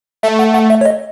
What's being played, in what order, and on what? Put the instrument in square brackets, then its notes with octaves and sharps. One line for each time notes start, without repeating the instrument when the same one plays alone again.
[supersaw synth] A3 [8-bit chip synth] E5
[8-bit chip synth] F#5
F#5
E5
C#5
D#5